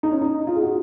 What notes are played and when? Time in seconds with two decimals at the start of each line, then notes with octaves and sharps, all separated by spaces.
0.03 D#4
0.12 C#4
0.22 D#4
0.47 F4
0.55 G#4
0.61 F#4